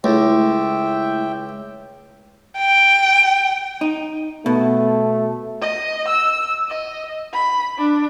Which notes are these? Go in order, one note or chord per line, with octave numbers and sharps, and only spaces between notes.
C#2 A3 E4 E5 G5
G5
D#4
B2 A3
D#5
E6
D#5
B5
D4